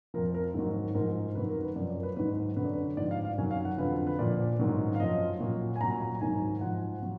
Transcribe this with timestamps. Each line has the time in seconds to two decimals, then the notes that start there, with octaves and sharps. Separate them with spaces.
0.14 F3 A#4
0.18 F2
0.34 A#4
0.54 G#2 D#3 F#3 A#4
0.94 G#2 F3 A#4
1.35 F#2 D#3 F#3 B4
1.49 A#4
1.63 B4
1.76 F#2 F3 D5
1.90 D5
1.98 A#4
2.03 B4
2.17 G#2 D#3 F#3 B4
2.56 F#2 D3 F#3 B4
2.65 D5
2.73 B4
2.97 G#2 F3 D5
3.11 F5
3.25 F5
3.38 F#2 D#3 F#3 G#5
3.51 F5
3.65 F#5
3.78 F2 D3 F3 B4
4.07 B4
4.19 A#2 F3 D5
4.59 G#2 D#3 F#3
4.95 F5
5.00 F#2 F3 D#5
5.40 A#2 F#3
5.76 G#5
5.81 A#2 A#5
5.83 F#3
6.02 A#5
6.21 G#2 D#3 F#3 G#5
6.61 G#2 F3 F#5
7.03 F#3